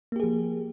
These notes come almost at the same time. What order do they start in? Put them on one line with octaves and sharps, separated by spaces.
A#3 G4 G#4 F3